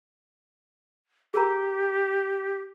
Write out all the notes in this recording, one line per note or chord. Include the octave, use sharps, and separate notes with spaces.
G4 G#4 A#4 A#5